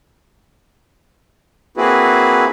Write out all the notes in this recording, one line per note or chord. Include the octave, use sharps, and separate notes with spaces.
A#3 C4 E4 F#4 G#4 B4